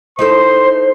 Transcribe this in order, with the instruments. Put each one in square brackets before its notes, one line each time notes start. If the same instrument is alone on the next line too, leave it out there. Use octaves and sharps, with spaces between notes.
[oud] D#4 E4 A4 [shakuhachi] C5 [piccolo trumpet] C6